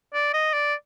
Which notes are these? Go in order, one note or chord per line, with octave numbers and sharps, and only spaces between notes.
D5
D#5
D5